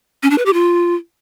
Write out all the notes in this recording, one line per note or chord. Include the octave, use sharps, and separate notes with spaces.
C#4
D4
B4
G4
F4